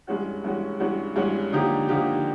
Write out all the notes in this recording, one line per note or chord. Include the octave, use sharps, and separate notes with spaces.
G2 E3 G#3 C#4 F#4
G2 E3 G#3 C#4 F#4
G2 E3 G#3 C#4 F#4
G2 E3 G#3 C#4 F#4
D3 F3 A#3 D#4 G4
D3 F3 A#3 D#4 G4